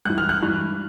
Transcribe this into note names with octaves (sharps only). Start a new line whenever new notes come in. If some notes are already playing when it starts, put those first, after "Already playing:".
G2 E3 F#6
F6
F#6
G2 E3